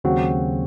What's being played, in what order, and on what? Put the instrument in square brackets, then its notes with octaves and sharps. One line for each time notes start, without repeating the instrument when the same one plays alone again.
[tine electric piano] D#2 C#3 F#3 C4 [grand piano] F#4